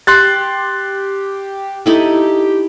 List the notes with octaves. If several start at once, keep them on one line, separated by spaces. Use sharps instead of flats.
G4 C6 F#6 A6
D#4 E4 G4 A4